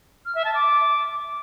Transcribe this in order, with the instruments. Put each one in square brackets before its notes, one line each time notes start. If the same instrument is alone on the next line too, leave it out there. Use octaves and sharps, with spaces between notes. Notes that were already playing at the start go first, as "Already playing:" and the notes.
[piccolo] F6
E5
A5
D6